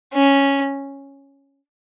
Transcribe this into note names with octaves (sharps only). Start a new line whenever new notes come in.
C#4